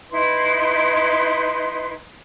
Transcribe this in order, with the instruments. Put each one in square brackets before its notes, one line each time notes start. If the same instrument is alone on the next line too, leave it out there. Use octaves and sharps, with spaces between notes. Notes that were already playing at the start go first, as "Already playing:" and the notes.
[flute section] D#4 E4 B4 C6